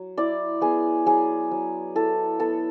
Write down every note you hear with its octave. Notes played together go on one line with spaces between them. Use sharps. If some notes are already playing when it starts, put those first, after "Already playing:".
Already playing: F#3
E4 D5
B3 G#4
F#3 G#4
F#3
E4 A4
B3 A4